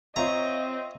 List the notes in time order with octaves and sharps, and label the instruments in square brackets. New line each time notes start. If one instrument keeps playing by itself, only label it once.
[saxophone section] C4 [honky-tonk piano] F4 C#5 E5 [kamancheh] D#5 [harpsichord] A#5